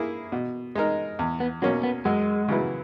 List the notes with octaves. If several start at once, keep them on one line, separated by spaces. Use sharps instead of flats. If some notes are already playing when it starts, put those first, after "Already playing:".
Already playing: A#3 E4 G#4
B2
G#3 D#4 A#4
E2
B3
B2 F#3 A#3 C#4
B3
F#2 G#3
C#3 F#3 B3 E4